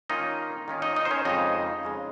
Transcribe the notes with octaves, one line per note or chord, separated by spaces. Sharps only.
D#3 A#3 C#4 D#4 F4 D#5
D#3 A#3 C#4 F4
D#4 D#5
D#4 D#5
C5
C#4 C#5
F2 C#3 G#3 D#4 D#5
F2 C#3 G#3